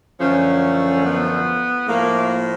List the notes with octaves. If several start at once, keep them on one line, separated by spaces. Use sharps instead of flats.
F#2 D3 F3 A3 C#4
B3
A2 F3 A3 A#3